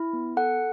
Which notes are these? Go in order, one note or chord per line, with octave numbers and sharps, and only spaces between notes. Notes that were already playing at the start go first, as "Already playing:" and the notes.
Already playing: E4
B3
A4 F#5